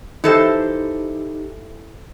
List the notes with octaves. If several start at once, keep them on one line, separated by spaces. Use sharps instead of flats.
E3 D#4 G4 A4 C5